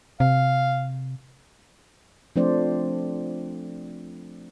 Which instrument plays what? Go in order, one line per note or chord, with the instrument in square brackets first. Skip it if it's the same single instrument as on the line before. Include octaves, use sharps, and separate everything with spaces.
[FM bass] C3 [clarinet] F5
[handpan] F3 A3 C4 D4 C5 D5